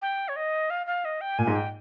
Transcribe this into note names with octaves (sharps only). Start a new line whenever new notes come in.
G5
C#5
D#5
F5
F5
D#5
G5
A#2 G#5
G#2
G5